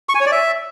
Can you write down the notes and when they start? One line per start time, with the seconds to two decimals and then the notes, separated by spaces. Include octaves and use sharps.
0.09 C#6
0.15 G#5
0.20 C#5
0.26 D5
0.32 E5